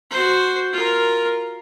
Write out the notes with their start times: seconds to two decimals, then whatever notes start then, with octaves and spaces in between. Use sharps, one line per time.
0.11 F#4 C5
0.73 F4 A#4